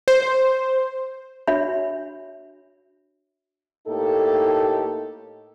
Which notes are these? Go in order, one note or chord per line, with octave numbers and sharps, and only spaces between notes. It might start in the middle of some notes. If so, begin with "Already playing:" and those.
C5
D4 F#4 C#5 E5 B5
A2 A#3 D#4 G4 A4